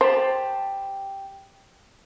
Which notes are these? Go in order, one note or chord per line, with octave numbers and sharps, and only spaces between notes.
G4 C5 A5 B5